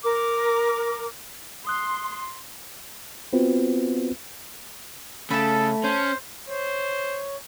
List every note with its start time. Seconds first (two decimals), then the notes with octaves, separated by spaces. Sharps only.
0.03 A#4 D6
1.67 C6 D#6 F#6
3.33 B3 C4 F4 F#4 B4 C5
5.31 C#3 A3 A4 A5 B5
5.84 C#4 C5
6.48 C5 C#5